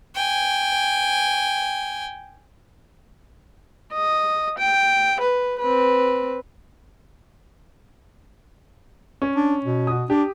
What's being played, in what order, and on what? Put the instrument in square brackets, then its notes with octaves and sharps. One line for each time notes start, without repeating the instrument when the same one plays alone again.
[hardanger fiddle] G5 G#5
[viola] D#5
G5
B4
C4 B4
[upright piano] C#4
[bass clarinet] D4
B2
[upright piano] F#4 D#6
[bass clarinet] D4 [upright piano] G4